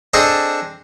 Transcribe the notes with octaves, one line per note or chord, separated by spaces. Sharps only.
C4 D4 G#4 A4 D#5